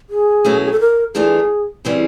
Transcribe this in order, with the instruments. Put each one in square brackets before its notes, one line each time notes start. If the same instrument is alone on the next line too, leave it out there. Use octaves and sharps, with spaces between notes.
[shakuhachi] G#4
[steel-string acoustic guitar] B2 F#3 A3 C#4 E4
[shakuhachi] G#4
A4
A#4
[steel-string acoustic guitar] G2 E3 A3 D4 F4 [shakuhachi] G#4
[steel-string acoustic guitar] C#3 E3 G3 C4